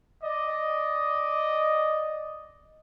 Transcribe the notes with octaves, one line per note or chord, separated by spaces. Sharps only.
D5 D#5